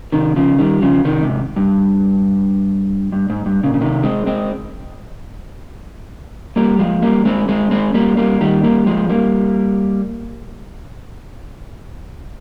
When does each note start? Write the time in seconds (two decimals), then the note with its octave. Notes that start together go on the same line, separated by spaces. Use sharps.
0.12 C3 D#3
0.36 C#3 F3
0.58 D#3 G3
0.82 C#3 F3
1.05 C3 D#3
1.22 G#2 C3
1.56 G2
3.12 G2
3.30 G#2
3.46 G2
3.63 A#2 C#3
3.74 C#3
3.81 C3 D#3
4.03 G#3 C4
4.26 G#3 C4
6.56 G3 A#3
6.79 F3 G#3
7.02 G3 A#3
7.25 G#3 C4
7.49 G#3 C4
7.71 G#3 C4
7.94 G3 A#3
8.17 G3 A#3
8.41 D#3 G3
8.63 G3 A#3
8.86 F3 G#3
9.09 G3 A#3